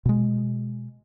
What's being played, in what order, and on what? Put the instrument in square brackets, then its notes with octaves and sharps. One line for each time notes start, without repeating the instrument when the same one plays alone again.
[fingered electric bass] B2 G#3